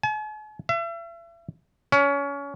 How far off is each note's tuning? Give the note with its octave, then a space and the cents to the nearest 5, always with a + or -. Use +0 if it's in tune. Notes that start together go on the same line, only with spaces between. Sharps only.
G#5 +45
E5 +40
C#4 +25